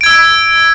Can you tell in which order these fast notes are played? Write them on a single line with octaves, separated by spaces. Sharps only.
D7 G#6 E6